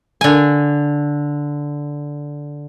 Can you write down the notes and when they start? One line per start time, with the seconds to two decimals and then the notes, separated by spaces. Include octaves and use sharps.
0.21 D3 G#5